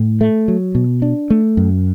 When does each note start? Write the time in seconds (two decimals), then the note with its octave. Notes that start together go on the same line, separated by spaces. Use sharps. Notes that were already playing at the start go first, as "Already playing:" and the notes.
Already playing: A2
0.21 A3
0.48 F#3
0.75 B2
1.02 D4
1.30 A3
1.57 F#2